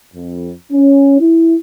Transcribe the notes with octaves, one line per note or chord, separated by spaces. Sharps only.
F2
C#4
E4